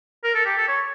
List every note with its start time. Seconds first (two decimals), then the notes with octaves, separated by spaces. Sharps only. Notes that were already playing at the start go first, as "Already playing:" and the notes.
0.24 A#4
0.35 A4
0.46 G4
0.58 A4
0.68 C#5